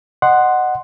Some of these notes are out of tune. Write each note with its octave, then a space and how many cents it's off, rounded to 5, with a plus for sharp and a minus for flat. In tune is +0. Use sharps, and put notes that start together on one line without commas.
D#5 -25 F#5 +0 C6 +0